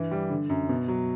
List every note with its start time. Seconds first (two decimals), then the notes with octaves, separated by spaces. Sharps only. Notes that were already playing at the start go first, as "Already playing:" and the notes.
Already playing: G2 E3
0.11 G3
0.30 D3
0.49 F#2
0.69 B2
0.88 F#3